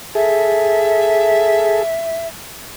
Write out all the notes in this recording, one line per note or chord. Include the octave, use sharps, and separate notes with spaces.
G#4 A4 E5